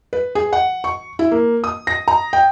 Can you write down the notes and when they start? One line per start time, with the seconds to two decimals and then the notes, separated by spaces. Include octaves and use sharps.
0.13 B4
0.35 G#4
0.53 F#5
0.84 C#6
1.19 E4
1.32 A#3
1.64 D#6
1.87 A#6
2.08 A#5
2.33 G5